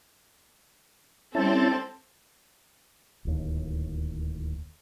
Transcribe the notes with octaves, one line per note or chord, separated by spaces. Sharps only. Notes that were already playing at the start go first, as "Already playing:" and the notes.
G3 C4 C#4 E4 A4 A5
D1 D#2